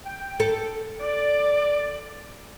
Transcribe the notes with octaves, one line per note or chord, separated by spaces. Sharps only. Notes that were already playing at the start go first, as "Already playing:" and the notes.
G5
A4
D5